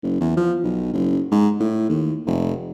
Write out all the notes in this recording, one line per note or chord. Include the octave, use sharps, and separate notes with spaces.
F#1
E2
F3
B1
F#1
G#2
A2
D#2
F1